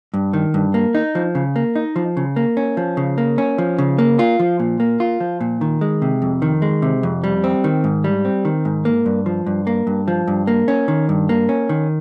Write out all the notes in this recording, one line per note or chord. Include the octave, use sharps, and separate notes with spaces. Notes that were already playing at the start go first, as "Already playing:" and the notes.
G2
D#3
G2
A#3
D#4
F3
C#3
A#3
D#4
F3
C#3
A#3
C#4
F3
C#3
A#3
C#4
F3
C#3
A#3
F4
F3
A#2
A#3
F4
F3
A#2
D#3
G#3
C3
F2
D#3
G#3
C3
F2
G3
C4
D#3
G#2
G3
C4
D#3
G#2
A#3
G2
F3
G2
A#3
G2
F3
G2
A#3
C#4
D#3
G2
A#3
C#4
D#3